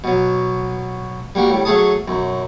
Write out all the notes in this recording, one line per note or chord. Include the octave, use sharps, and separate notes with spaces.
B2 F#3
G3 A#3 F#4 G4
A2 G3
F#3 A3 G#4 C#5 A5 D#6
B1 F#2